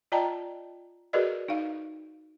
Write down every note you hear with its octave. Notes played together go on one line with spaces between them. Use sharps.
F4 D5 D#5 G5 A5 A#5
F#4 G#4 A#4 B4 D5 D#5
D#4 F5